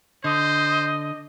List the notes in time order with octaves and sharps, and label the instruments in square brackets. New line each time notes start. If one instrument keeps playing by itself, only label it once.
[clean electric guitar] D3 [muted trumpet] C5 [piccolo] D#5